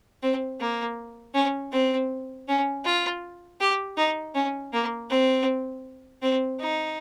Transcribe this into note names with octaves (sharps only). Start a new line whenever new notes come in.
C4
A#3
C#4
C4
C#4
F4
G4
D#4
C#4
A#3
C4
C4
D#4